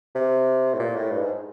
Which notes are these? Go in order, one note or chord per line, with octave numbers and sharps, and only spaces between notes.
C3
A2
A#2
A2
G2
G#2